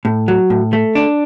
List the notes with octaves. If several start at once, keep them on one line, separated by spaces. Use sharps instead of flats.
A2
F#3
A2
A3
D4